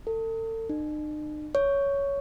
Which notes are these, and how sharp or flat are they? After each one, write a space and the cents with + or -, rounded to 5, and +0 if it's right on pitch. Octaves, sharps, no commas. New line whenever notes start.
A4 +35
D#4 -45
C#5 +10